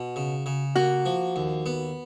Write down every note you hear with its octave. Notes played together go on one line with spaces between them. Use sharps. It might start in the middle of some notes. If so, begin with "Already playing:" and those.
Already playing: B2 F#4
C#3
C#3
A#3 F#4
F3
D#2
B3